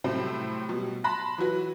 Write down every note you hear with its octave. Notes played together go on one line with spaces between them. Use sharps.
A2 C3 F#3 G3 A3 C4
B2 F#3 G3
A5 B5 C6 F#6 A#6
E3 F#3 F#4 B4